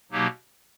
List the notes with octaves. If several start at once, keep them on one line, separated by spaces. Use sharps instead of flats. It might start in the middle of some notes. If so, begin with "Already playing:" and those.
B2 F#3 A#3 D#4 G4